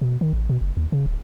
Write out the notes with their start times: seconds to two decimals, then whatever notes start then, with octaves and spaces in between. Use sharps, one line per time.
0.01 B2
0.21 D#3
0.33 A1
0.49 B2
0.61 F#1
0.77 D#2
0.92 C#3
1.06 D1